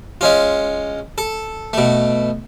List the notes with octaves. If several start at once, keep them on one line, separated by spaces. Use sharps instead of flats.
G#3 C#4 F4
A4
B2 A3